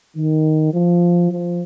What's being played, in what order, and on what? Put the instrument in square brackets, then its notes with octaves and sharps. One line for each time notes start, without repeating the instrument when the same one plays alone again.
[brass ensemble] D#3
F3
F3